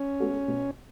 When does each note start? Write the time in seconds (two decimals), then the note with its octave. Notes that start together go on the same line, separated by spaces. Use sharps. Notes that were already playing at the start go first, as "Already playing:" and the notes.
Already playing: C#4
0.20 G#3 B3 F#4 A4
0.48 B2